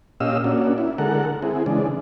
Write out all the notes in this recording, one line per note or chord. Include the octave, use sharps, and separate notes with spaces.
A#2 C#4 G4 D#5 F5 E6
A#3 C#4 D4 F#4
E4
D3 G#3 A4 A#4 F#5
C4 E4 G#4
C#3 E3 G#3 D4